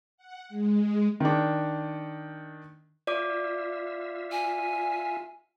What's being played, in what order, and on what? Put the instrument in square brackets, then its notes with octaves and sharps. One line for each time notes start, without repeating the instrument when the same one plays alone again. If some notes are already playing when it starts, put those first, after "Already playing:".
[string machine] F#5
G#3
[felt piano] D#3 D4
[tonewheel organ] F4 E5 [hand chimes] D5 D6
[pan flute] G#5